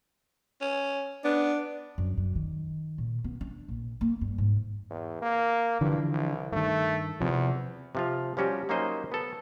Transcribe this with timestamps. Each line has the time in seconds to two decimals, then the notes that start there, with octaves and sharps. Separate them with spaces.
0.61 C#4
1.24 B3 D4
1.98 F#2
2.17 F#2
2.36 D#3
2.98 A#2
3.24 B3
3.41 D4
3.68 A#1
4.01 A#3
4.21 G2
4.38 G#2
4.90 E2
5.22 A#3
5.81 G2 D3 E3 F3
6.11 C2
6.52 G2 D#3 A3
7.20 E2 C3 F3
7.95 C3 F3 F4
8.37 F3 G3 C#4 F#4 G4
8.69 F#3 A#3 C#4 D#4 C5 D#5
9.12 B3 A4